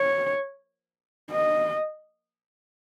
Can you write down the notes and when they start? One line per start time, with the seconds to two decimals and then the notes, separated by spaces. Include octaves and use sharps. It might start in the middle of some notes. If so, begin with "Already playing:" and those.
Already playing: C#5
1.30 D#5